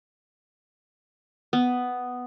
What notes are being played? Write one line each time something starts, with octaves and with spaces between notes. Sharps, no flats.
B3